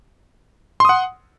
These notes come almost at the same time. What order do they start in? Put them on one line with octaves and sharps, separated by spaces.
C6 D#6 F#5